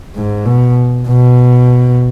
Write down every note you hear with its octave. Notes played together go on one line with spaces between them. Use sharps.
G#2
B2
B2